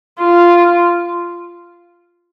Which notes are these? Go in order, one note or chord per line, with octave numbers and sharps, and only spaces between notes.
F4